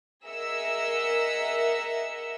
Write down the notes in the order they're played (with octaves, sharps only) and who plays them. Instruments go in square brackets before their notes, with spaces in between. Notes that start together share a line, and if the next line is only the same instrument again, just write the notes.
[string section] G#4 A#4 D#5 E5 F#5 E6